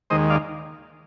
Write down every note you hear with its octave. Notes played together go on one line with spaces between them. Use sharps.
D#2 D#3 G#3 C5 D#5
D5 F5